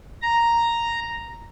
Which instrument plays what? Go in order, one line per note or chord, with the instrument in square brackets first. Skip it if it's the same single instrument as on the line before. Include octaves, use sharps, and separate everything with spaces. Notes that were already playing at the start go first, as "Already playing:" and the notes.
[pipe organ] A#5